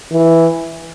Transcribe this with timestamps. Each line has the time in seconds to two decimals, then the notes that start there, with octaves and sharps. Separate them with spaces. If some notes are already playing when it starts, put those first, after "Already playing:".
0.12 E3